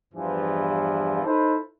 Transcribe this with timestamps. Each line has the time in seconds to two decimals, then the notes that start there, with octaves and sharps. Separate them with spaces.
0.13 E2 G2 E3 F3
1.25 D#4 E4 A4 B4 C5